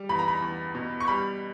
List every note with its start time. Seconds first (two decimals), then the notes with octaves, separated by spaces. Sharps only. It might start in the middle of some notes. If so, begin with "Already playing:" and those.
Already playing: G3
0.09 E2 B5
0.19 A#5
0.28 B5
0.42 E2
0.75 B2
1.00 C#6
1.07 G3 B5